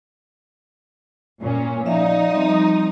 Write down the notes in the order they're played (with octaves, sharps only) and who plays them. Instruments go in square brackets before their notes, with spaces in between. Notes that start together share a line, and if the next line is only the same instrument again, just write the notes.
[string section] A#2 C#4
[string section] F3 D#4 D#6 [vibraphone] D5 E5 F5
[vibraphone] G3 C4